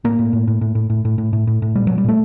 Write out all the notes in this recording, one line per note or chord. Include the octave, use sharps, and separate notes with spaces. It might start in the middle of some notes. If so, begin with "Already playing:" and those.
A2 A#3
A2
A2
A2
A2
A2
A2
A2
A2
A2
A2
A2
A#2 G3
A#2 F#3
G3
A#2 A3